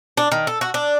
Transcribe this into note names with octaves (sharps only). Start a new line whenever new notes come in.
D4
D#3
A4
F#4
D4